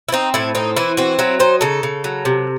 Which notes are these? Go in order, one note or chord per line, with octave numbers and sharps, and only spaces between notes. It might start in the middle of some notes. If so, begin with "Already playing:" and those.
E4
C4 D#4
A2 E4
C4 D#4
E3 E4
C4 F#4
F#3 E4
D#4 C5
C#3 A4
C#3
F#3
C3